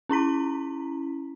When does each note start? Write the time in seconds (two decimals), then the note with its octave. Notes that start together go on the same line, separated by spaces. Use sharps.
0.09 C#4 E4 A#5 B6